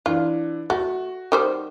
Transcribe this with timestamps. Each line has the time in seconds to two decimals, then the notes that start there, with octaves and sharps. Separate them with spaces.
0.06 E3 D4 F4
0.70 A3 F#4
1.32 D#3 G3 C5